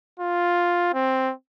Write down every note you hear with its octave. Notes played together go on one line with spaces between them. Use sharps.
F4
C4